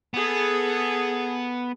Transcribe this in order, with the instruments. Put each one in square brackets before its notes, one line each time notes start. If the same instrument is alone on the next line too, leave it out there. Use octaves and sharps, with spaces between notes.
[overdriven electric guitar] B3 [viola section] G#4 A4